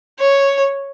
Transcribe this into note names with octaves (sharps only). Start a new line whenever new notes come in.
C#5